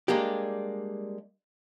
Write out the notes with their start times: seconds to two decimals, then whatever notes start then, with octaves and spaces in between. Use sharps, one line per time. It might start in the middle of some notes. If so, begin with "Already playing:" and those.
0.08 G3 G#3 A#3 D4 G4